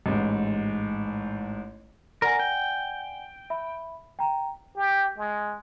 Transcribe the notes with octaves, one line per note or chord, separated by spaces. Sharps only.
A1 G#2
A#4 D5 F#5 G#5
G5
E5 B5
G5 A#5
G4
G#3